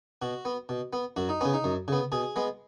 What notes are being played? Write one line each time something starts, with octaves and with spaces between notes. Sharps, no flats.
B2 F#4
B3
B2
B3
F#2 F#4
D#4
C#3 B3 C#4
D#4
F#2
C#3 B3
B2 G#4
G#3 B3